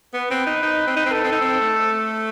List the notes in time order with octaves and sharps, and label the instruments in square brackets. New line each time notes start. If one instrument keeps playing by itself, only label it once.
[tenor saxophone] B3 [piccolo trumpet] B4
[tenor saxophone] C4
D#4
D#4
C4
D#4
C4
[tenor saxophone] D#4 [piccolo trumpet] A4
[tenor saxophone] C4
D#4
C4
A3